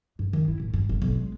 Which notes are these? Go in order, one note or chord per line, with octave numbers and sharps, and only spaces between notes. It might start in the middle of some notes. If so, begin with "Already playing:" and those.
G2
D#3
E4
A2
G2
G1
B1
G#3